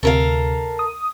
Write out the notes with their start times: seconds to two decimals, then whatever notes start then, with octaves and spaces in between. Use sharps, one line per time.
0.03 D2 C3 A4 A#4 F5
0.79 D#6